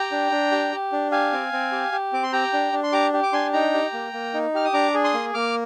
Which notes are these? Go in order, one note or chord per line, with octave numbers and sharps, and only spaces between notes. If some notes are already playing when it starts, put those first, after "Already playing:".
Already playing: G4 G5 A#5
D4
D4
G4
G4
D4
G4 F5 G#5
C4
C4
G4
G4
C4 D6
C6
G4 G5 A#5
D4
D4
C6
G4 A#5 D6
G4
D6
D4 G#5 C6
D#4 G5 A#5
G4
A#3
A#3
D#4
G4 F6
D#6
D4 A#5 D6
G#4
C6 D#6
A#3
A#3 D6 F6